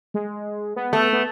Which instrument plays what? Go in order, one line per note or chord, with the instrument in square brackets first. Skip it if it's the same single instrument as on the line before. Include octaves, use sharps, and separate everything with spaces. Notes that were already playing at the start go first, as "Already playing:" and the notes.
[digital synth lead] G#3
B3
[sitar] A3
[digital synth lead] B3